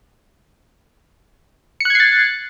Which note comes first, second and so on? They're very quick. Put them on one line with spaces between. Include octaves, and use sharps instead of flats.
C#7 F#6 G#6 C7 A6